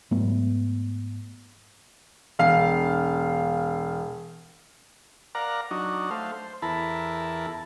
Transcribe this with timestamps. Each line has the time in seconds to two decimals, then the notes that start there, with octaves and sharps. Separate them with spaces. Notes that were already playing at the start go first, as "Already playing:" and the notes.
0.11 G#2 F#3 A3 B3
2.39 E1 F5 C7
5.35 A#4 D5 F5 F#5 A#5
5.71 F#3 D4 D#4 F#4
6.11 A3 C5 F5
6.34 C5
6.62 E2 E4 A4 A#4 A5 B5